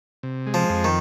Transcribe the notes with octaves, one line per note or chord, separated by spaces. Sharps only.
C3
G#3
F3
F2
D#3